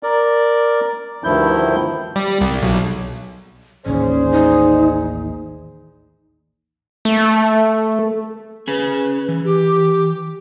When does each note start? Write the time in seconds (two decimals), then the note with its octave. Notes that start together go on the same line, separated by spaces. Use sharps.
0.03 A#4 D5
1.24 D2 G2 D#3 F3 E4 G6
2.16 G3
2.41 C2
2.62 B1
3.86 A1 D#2 D#3 C#4 G#4 C5 D5
4.32 D#4
7.05 A3
8.68 C#4 G#4 B4 G#5
9.28 E3
9.45 G4